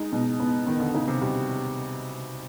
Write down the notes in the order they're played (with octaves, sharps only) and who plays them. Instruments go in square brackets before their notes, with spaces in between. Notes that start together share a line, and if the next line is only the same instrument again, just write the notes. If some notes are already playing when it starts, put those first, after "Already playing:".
Already playing: [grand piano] G#3 [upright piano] D#4
[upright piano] B2
B3
[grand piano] D#3 [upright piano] B3
[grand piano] D3
[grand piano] C#3 [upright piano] D#4
[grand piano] C3
[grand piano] B2 [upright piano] G3